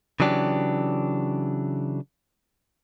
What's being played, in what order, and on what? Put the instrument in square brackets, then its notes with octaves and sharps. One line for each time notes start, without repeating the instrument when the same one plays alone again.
[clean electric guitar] C#3 E3 F#3 D4 G4